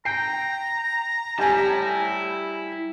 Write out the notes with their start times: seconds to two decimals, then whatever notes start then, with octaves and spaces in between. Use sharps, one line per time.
0.05 G5 A#5 C7
1.39 G3 E4 G4 G#5 A5